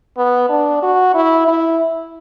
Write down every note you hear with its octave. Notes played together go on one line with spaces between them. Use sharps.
B3
D4
F#4
E4
E4